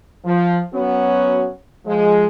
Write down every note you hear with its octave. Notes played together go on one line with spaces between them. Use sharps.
F3
F#3 B3 C#4 F#4
F3 G#3